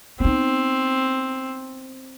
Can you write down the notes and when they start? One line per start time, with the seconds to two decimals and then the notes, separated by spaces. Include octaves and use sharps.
0.20 B3 C4 D#4